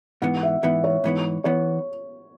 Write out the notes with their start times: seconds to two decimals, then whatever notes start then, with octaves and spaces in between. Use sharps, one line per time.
0.22 G#2 E3 B3 F#5
0.43 E5
0.63 G#2 E3 B3 E5
0.84 C#5
1.04 G#2 E3 B3
1.44 E3 B3 C#5